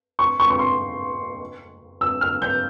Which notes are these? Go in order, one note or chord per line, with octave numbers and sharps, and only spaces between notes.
C#6
C#6
C#6
C6
E6
F6
G6